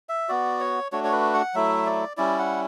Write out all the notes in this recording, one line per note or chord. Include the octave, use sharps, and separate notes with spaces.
E5
B3 F#4 D5
C#5
A3 D4 F#4 C#5
C#5
B4
F#5
F#3 A3 E4 E5
D5
G3 C#4 E4 D5
F#5